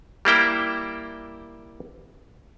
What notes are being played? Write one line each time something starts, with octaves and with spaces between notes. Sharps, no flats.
G3 A#3 E4 G5